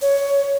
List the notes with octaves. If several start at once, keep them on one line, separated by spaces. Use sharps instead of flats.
C#5